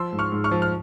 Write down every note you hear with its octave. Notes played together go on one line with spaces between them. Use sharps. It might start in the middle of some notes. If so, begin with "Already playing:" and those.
Already playing: F3 C6 E6
G#2
C#6 F6
G#2
C#6 F6
F3
F6